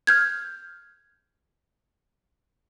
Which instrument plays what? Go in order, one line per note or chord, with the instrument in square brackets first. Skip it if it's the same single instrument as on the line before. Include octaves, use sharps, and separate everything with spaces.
[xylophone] F6 G6 G#6